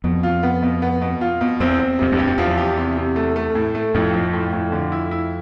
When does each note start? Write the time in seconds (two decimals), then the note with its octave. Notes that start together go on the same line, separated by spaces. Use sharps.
0.04 F2 B2
0.23 F4
0.43 B3
0.63 B2
0.82 B3
1.01 B2
1.21 F4
1.41 B2
1.60 E2 C4
1.80 C4
1.99 F2 C3
2.12 E2 G2
2.18 G4
2.27 F2
2.38 E2 F3
2.58 G4
2.77 C3
2.97 C3
3.16 A3
3.36 A3
3.55 A2
3.75 A3
3.94 F2 A2
4.14 F3
4.33 A2
4.53 A2
4.72 D3
4.92 E4
5.11 E4